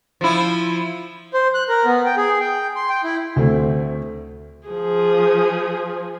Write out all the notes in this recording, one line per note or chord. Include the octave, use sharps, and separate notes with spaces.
F3 E4
C5
F#6
A#4
B3
G5
G#4
G5
C6
G5
E4
D2 A3 C4
F3 G#4